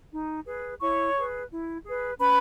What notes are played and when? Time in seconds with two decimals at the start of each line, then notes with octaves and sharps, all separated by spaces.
0.12 D#4
0.46 G#4 B4
0.81 E4 C#5 C#6
1.15 G#4 B4
1.50 E4
1.84 G#4 B4
2.18 C#4 B4 B5